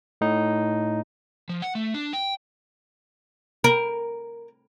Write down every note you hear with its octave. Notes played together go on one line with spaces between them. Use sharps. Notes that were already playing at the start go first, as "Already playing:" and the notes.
A2 D#4
F3
F#5
A3
D4
G5
A#4